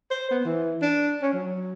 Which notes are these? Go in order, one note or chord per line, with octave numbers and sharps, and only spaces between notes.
C5
B3
E3
D4
C#4
F#3